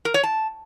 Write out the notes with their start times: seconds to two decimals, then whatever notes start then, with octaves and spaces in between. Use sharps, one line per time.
0.05 A#4
0.14 C#5
0.23 A5